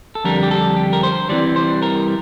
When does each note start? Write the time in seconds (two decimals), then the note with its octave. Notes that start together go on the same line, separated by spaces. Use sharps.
0.15 A4
0.24 F2 D3 G3 A#4
0.43 G4
0.51 A4
0.77 G4
0.93 A#4
1.03 C5
1.29 C2 C3 E3 G3 D5
1.56 C5
1.82 A#4